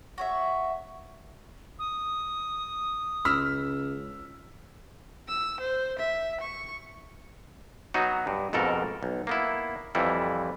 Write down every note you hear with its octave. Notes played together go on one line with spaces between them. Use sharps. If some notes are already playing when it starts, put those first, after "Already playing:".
F#4 C#5 E5
D#6
C#2 E6 F6 B6
E6
C5
E5
C#6
F#3 B3 D#4 F#4
G2
F2 G#2 B2 A4 A#4
B1
A#3 B3 E4
F2 E3 G3 E4